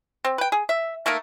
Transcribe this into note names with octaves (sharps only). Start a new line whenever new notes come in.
C4
B4 G5
G#4
E5
A3 A#3 D#4 A#4